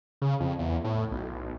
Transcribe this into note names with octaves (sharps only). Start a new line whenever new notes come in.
C#3
F2
E2
A2
B1